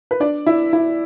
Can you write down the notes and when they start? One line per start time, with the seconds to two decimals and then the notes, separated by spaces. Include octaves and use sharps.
0.11 B4
0.20 D4 D5
0.46 E4 E5
0.73 E4 E5